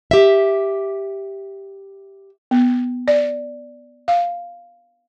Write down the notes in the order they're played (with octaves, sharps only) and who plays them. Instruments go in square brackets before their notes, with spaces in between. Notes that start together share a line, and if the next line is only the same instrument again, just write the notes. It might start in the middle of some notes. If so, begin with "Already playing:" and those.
[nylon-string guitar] G4 E5
[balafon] B3
D5
F5